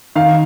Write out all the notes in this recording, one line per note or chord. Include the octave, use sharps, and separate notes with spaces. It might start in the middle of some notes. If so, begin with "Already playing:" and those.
D#3 F5